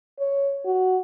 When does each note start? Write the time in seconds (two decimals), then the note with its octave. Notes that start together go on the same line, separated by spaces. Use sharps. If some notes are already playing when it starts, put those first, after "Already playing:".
0.19 C#5
0.65 F#4